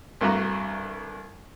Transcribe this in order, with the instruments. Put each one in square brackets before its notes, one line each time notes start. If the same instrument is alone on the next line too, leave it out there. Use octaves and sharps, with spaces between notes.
[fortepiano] C2 G2 A3 F#4 A#5